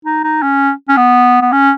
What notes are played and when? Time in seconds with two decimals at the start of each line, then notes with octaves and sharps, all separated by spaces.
0.05 D#4
0.24 D#4
0.43 C#4
0.89 C#4
0.97 B3
1.41 B3
1.52 C#4